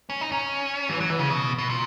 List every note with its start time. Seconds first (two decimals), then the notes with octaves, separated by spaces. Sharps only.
0.10 C#4
0.21 D#4
0.32 C#4
0.89 E3
1.00 F#3
1.10 E3
1.19 C#3
1.30 B2
1.58 B2
1.69 A#2